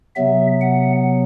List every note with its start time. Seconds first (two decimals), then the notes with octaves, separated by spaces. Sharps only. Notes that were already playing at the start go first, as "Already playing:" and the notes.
0.15 C3 F#3 B3 E5
0.61 F#5